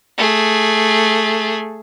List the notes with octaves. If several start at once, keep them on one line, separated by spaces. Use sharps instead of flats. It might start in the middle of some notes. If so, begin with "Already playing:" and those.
A3 G#4